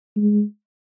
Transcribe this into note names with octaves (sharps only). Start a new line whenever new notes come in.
G#3